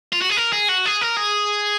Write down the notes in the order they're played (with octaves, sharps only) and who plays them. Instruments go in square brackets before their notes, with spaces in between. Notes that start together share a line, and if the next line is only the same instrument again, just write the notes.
[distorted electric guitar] F4
F#4
G#4
A#4
G#4
F#4
G#4
A#4
G#4